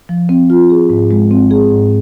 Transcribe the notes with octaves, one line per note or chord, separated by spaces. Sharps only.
F3
C4
F4
G#4
G#2
G#3
C4
G#4
G#2